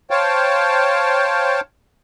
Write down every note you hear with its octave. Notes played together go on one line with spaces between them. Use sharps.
C5 C#5 F5 G5 A5